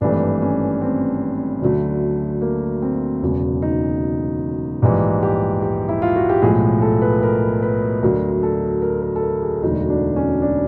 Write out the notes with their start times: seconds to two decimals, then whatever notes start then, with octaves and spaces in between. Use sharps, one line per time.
0.01 G#1 G2 E3 A3 D4
0.42 C#4
0.81 C4
1.62 D2 D3 F#3 A3
2.42 A#3
2.82 C4
3.22 E1 E2 C#3 F#3
3.62 D#4
4.82 A#1 G#2 E3 G3
5.23 G4
5.62 G4
5.89 E4
6.02 F4
6.16 F#4
6.30 G4
6.42 B1 A2 F3 G#3 G#4
6.82 A4
7.02 B4
7.23 A#4
7.62 B4
8.02 D2 D3 F#3 A#4
8.43 A4
8.82 A#4
9.03 A#4
9.16 A4
9.22 A#4
9.42 G#4
9.62 E1 D2 D3 F#3 D#4
9.90 D4
10.16 C#4
10.42 D4